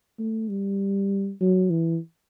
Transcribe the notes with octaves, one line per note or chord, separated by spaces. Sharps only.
A3
G3
F#3
E3